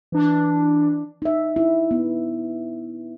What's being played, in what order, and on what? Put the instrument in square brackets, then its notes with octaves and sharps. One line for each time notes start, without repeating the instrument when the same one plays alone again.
[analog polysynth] E3 D4
[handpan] D#4 E5
E4
B3